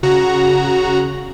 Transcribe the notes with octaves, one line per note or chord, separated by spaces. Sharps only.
C#3 F#4 A#5